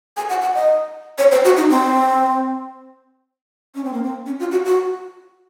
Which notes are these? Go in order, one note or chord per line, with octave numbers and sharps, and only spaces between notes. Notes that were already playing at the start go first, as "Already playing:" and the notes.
G#5
F#5
F#5
D#5
C#5
C5
F#4
D#4
C4
C#4
C4
A#3
C4
C#4
F4
F#4
F#4